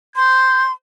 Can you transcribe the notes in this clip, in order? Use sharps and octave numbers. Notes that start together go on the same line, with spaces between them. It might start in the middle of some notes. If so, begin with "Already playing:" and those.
C6 G6